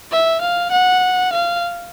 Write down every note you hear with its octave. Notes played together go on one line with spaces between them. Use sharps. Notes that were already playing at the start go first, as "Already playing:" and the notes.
E5
F5
F#5
F5